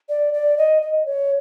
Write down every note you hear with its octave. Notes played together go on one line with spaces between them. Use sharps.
D5
D5
D#5
D#5
C#5